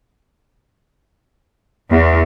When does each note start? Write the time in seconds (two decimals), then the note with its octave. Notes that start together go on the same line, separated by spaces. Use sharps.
1.91 E2